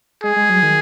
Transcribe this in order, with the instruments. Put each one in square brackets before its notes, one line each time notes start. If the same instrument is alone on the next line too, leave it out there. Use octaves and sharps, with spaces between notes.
[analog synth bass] G#3 [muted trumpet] G#4
[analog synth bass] G#3
F#3
D#3